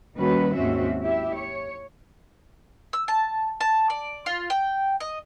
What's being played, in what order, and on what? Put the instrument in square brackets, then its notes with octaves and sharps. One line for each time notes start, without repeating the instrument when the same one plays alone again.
[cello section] D#2 D#3 G3 C#4 F#4 B4
D#2 G#2 C4 C#4 F#4 E5
E4 G4 E5
C#5
[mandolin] E6
A5
A5
D5
F4
G5
D#5